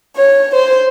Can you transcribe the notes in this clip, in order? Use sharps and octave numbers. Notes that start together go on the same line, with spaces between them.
C#5
C5